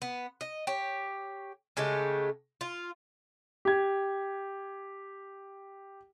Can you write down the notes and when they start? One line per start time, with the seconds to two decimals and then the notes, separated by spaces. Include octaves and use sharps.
0.02 B3
0.41 D#5
0.67 G4 C#5
1.77 C#3 G#3 A3 G4
2.61 F4
3.65 G4 G#6